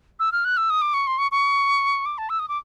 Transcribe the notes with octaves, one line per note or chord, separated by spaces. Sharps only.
E6
F6
F#6
E6
D#6
D6
C#6
C6
C#6
C#6
D6
A5
E6
D#6
D6